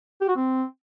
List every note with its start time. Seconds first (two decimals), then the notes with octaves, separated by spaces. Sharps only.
0.21 G4
0.29 F#4
0.36 C4